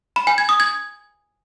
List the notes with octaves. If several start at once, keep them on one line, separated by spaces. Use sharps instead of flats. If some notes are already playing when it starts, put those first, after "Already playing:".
B5
G#5
G#6
D#6
G#6